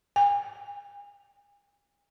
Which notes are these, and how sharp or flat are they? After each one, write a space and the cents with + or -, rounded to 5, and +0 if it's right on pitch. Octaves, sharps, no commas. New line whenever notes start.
G#5 -40